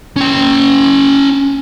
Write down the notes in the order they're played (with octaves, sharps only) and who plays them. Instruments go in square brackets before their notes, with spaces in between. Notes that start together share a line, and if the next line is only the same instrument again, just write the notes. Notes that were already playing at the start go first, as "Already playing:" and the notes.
[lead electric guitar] C#4 G5